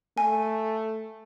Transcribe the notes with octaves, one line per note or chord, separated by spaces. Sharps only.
A3 G#5